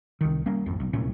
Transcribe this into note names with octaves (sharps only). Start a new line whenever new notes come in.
C2 D#3
G3 A#3 C#4
G#1 F2
B1
D1 C2 A#2 C#4